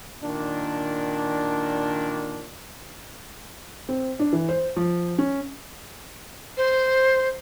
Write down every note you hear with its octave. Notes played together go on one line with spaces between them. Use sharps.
A#2 D#3 D4
C4
D4
E3
C5
F3
C#4
C5